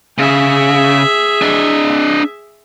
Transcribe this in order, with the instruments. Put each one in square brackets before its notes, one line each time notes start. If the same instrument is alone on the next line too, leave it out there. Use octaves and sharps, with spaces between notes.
[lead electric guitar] C#3 [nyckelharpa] G#4 E5
[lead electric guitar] D4 D#5